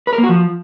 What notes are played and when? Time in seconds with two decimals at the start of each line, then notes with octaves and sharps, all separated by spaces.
0.07 B4
0.13 A#4
0.18 A#3
0.24 F#4
0.29 F3